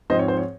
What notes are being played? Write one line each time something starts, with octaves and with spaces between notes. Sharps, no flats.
G#2 F3 C4 C5 D#5
C#5
C5
C#5